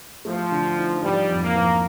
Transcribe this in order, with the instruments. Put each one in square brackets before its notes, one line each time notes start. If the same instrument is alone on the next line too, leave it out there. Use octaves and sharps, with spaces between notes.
[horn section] F3 [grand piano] A3
[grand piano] D3
D#4
[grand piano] F3 [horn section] G3
[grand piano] F2
[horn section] A#3
[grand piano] F3